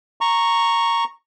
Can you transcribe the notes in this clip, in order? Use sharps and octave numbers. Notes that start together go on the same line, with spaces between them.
A#5 C#6